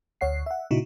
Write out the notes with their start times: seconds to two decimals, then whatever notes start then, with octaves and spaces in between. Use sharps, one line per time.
0.21 D2 C#5 F#5 C7
0.46 E5 F#5
0.71 A#2 C#3 D#4 E4 F#4